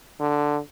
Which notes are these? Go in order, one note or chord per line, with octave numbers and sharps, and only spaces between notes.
D3